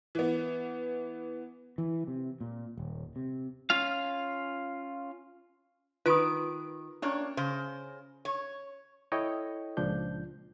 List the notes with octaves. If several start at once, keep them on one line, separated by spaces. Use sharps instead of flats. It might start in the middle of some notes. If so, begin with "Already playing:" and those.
E3 B3
E3
C3
A#2
D#1
C3
C#4 F4 F5
D#3 F4 B4 C6 D#6 D7
A#3 C#4 D4 C#5
C#3 C5
C#5
E4 A4 C#5 D#5 G5
C#2 A#2 F3 D4 G6